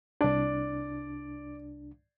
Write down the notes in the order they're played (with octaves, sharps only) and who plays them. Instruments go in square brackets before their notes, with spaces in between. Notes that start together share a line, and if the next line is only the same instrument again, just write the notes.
[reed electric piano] C2 D4 [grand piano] D5